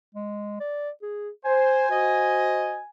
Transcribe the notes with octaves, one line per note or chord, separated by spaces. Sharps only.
G#3
D5
G#4
C5 G#5
F#4 C5 D#5